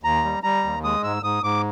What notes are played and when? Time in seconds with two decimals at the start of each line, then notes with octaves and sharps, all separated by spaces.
0.03 D#2 A#5
0.24 G3
0.43 G3 A#5
0.64 D#2
0.84 G#3 D#6
1.03 G#2 E6
1.23 G#2 D#6
1.43 G#2 D6